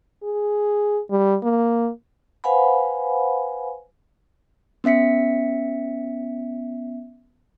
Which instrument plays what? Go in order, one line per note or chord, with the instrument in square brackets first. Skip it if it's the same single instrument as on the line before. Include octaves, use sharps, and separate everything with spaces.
[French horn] G#4
G3
A#3
[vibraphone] B4 C5 F5 F#5 G#5 B5
[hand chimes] B3 C#4 E5 B6 C#7